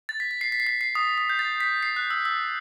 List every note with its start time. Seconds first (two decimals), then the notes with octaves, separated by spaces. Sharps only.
0.09 A6
0.20 B6
0.31 B6
0.41 C7
0.52 B6
0.60 C7
0.67 B6
0.81 C7
0.95 D#6
1.18 D#6
1.29 G6
1.39 A6
1.60 B6
1.83 C7
1.96 F#6
2.11 E6
2.25 E6